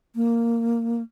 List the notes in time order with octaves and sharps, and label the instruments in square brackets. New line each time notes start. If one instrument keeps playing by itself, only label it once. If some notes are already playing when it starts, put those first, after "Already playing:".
[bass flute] A#3